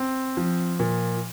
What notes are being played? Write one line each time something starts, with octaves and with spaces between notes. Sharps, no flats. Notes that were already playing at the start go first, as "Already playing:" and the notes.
Already playing: C4
F3
A#2